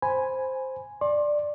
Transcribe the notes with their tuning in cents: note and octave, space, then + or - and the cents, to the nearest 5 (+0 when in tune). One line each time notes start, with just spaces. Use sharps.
C5 +0 G#5 +0 B5 +0
D5 +5 C6 +40